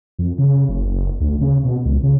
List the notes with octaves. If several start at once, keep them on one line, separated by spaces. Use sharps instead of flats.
F2
C#3
F#1
F#1
D2
C#3
B2
C#2
C#3